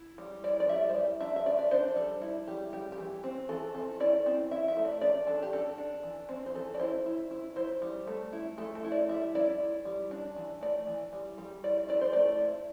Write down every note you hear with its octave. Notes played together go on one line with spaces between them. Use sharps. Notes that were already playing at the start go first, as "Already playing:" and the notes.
Already playing: E4
G3
E4 D5
D5
G3 E5
C5
G3 D5
D4 E5
E5
D4 D5
D5
D4 C5
G3 A4
E4
G3 G4
G3 G4
G4
E3
C4
E3 A4
C4 A4
E4 D5
C4
E4 E5
E5
A3
D5
D4 D5
D4 A4
G4
D4 A4
D4
E3
C4
C5
E3 A4
D5
E4 C5
E4
E4
E4 C5
G3
A3
E4
A3 A4
A4
E4
D5
G3 E5
E4 D5
E4
G3
D4
E3
A3 D5
E3
G3
G3
E4 D5
E4 D5
C5
A3 D5
E4